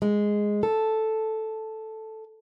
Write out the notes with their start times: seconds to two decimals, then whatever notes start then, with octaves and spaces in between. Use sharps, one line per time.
0.02 G#3
0.63 A4